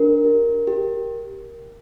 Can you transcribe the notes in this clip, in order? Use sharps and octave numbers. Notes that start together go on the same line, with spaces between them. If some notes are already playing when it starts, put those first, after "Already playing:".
Already playing: D4 A#4
G4
G4